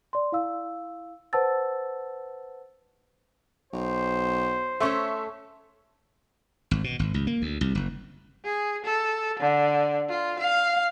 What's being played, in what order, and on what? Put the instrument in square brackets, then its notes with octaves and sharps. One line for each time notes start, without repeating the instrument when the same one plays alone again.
[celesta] D5 C6
E4 F5 E6
B4 C5 F#5 A5 E6 A6
[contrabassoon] B1 [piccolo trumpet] C5
[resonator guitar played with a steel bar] A3 C#4 A4 [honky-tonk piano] E5 C6 C#6
[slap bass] G#1
B2
G#1
C#2
A#3
D2
C2
F#1
[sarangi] G#4
A4
D3
F4
F5